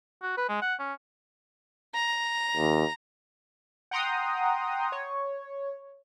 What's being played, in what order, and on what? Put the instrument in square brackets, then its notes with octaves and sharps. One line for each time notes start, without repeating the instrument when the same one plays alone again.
[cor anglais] F#4
B4
G#3
F#5
C#4
[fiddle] A#5
[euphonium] D#2
[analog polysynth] F#5 G5 A#5 C6 D#6
C#5